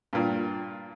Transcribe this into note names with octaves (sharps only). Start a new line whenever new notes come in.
G2 A#2